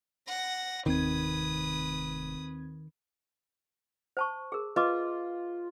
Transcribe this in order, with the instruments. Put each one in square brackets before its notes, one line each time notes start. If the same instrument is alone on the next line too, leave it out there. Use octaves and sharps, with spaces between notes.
[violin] F#5 A#6
[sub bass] F1 [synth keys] D#2 C4 G#6 [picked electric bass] D#3 [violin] B4 D#6
[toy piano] C5 A5 C#6
G#4 A#4
[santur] F4 [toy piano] B4 D#5 D6